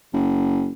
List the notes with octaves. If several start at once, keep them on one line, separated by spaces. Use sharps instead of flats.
F#1